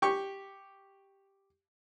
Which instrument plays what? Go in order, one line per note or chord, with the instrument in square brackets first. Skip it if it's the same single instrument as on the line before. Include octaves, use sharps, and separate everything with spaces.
[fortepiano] G4 C#6